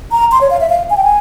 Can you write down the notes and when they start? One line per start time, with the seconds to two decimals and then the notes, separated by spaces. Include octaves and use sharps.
0.11 A#5
0.32 C6
0.41 C#5
0.50 F5
0.60 E5
0.69 F5
0.90 G#5
0.97 G5
1.04 G#5